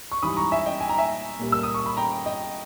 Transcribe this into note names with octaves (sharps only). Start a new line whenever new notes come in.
C#6
G#2 E3 G3 B5 D#6
A#5 C#6
E5 G#5
D#5 G5
G#5
A#5
E5 G#5
A#2 G3 A#3
E6
D#6
C#6
B5
G5 A#5
D#5 G5